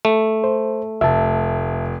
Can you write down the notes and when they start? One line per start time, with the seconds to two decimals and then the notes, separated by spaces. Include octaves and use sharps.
0.05 A3
0.44 C5
1.01 F1 E5 A5